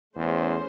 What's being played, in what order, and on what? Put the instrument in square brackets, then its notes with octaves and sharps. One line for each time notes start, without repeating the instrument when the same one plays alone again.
[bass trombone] E2 [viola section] A3 C#4 G#4 C5